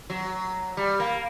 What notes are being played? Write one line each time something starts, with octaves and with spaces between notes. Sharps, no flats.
F#3
G3
A#3